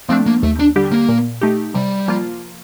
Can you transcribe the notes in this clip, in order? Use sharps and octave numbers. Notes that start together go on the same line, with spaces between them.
F3 A3 C4 D4
A#3
D#2 A3
D4
D3 G3 D4 G4
A#3
A#2
A3 D#4 G4
C3 G3
F3 A#3 F4